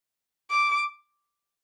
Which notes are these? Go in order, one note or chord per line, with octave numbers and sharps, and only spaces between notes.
D6